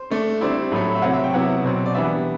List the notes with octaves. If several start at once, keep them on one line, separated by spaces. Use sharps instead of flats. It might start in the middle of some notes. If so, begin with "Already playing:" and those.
Already playing: C5
D3 A3 D4
D3 G3 C4 E4 D5
A2 F#3 A3
E5
C3 F#3 C4 F#5
E5
G5
C3 F#3 B3 E4 F#5
B2 F#3 C4
D5
E3 G3 B3 D4 E5